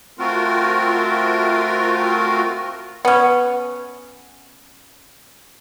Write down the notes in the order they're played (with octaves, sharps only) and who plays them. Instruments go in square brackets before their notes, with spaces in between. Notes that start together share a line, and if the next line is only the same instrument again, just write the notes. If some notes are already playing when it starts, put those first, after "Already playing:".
[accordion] A3 C4 F4 F#4 A#4
[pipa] B3 C#4